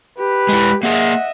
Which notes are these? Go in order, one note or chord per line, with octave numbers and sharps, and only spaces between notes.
G4 B4
G#3 E4
A#3 G#4 D#5 E5 F#5